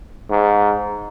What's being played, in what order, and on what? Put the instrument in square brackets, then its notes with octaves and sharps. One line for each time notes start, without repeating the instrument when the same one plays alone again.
[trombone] G#2